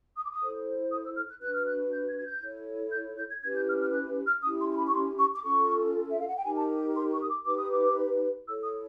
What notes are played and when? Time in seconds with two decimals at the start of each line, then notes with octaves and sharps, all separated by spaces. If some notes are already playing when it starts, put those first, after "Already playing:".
0.16 D#6
0.24 D6
0.31 D#6
0.41 E4 A4 C5
0.91 D#6
1.04 E6
1.16 F6
1.29 F#6
1.41 D4 F#4 B4 F#6
1.53 F6
1.66 F#6
1.92 G6
2.09 G#6
2.20 G#6
2.26 G6
2.42 E4 A4 C#5
2.92 G6
3.18 G6
3.30 G#6
3.43 C#4 E4 G4 B4 G#6
3.56 G6
3.68 F6
3.81 F6
3.93 F#6
4.26 F6
4.43 C#4 E4 G4 D#6
4.60 C6
4.73 C6
4.77 B5
4.87 C#6
4.94 C6
5.19 C#6
5.34 D6
5.44 C#4 F4 A4 C#6
6.10 E5
6.19 F5
6.28 F#5
6.37 G5
6.45 D#4 G4 A#4 G#5
6.58 A5
6.96 C6
7.12 C#6
7.22 D#6
7.29 D6
7.46 D#4 G4 B4 D6
7.58 D#6
7.72 D6
8.47 E4 A4 C#5 E6
8.63 D#6